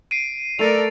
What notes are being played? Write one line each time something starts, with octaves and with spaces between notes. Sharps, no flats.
C7 D7 D#7
A3 A4 A#4 D5 A6 D#7 F7